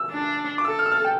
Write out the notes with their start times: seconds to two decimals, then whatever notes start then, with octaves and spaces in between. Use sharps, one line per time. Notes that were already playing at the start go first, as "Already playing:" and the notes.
Already playing: E6
0.10 D4
0.58 D6
0.65 A4 E6
0.79 F6
0.86 E6
0.91 F6
1.05 G5